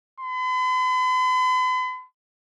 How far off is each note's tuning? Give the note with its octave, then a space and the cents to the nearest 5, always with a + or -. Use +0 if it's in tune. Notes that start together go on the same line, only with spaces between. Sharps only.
B5 +45